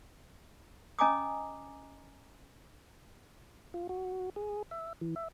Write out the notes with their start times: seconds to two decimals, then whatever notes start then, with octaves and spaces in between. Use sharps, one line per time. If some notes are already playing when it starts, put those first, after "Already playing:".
0.99 C#4 D#5 G#5 A#5 D6 D#6
3.74 F4
3.89 F#4
4.36 G#4
4.71 E5
5.01 E3
5.16 E5